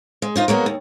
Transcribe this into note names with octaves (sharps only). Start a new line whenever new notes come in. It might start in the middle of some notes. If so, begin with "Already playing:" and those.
G#3
D#4 F4 C5
F#3 G#3 A#3 B3
D#2